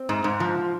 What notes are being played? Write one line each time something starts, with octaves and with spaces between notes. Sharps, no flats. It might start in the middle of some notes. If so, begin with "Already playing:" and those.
Already playing: C4
G#2
G#2
F3